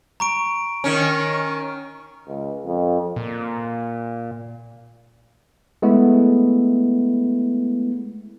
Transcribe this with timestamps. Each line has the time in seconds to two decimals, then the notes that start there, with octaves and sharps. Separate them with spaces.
0.20 A#5 C#6 D7
0.84 D#3 C#4
2.27 C#2
2.66 F2
3.16 A#2
5.82 G#3 A3 B3 E4